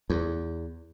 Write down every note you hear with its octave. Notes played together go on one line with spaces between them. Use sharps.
E2